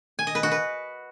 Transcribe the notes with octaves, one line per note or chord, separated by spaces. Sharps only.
G#5
D#5
B4
F#4
B4